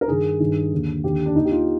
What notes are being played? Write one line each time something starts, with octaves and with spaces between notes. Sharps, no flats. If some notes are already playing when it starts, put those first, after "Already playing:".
A#4
G2 D#3 G#4
G2 D#3
D#2 D3
D#2 D3 G4
D4
D#2 D#3 D#4
G4
F4